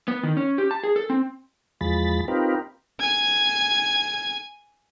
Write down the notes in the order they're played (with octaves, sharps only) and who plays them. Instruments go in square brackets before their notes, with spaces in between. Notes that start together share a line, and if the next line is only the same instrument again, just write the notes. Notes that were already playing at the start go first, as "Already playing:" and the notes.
[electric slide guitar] B3
D#3
C#4
G4
A5
G#4
A4
C4
[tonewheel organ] E2 F3 G#3 B5 A6
C4 D#4 F4 G4 A#4 B4
[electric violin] G#5 G#6